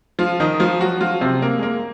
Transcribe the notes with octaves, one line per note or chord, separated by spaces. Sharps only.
F3 F4
D#3 D#4
F3 F4
F#3 F#4
F3 F4
C3 C4
A#3
G#3
A#3